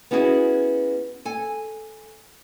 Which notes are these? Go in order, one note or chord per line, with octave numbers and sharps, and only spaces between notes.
B3 C#4 E4 F#4 G#4
A4 G#5